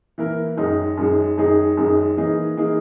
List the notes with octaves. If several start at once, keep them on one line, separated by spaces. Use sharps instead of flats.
E3 A#3 E4 A#4
F#2 D#3 G#3 D#4 G#4
F#2 D#3 G#3 D#4 G#4
F#2 D#3 G#3 D#4 G#4
F#2 D#3 G#3 D#4 G#4
E3 A#3 D#4 G#4
E3 A#3 D#4 G#4